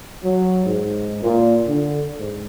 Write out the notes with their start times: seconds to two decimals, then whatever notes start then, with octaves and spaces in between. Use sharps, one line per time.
0.23 F#3
0.65 G#2
1.22 A#2
1.68 D3
2.18 G#2